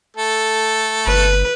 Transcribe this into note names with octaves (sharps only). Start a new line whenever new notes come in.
A3 A4
G1 B4